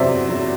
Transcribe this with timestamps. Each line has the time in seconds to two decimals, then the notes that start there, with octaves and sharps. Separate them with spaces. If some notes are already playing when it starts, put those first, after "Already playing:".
Already playing: E2 C3 F#3 C5 D5 E5
0.29 F#3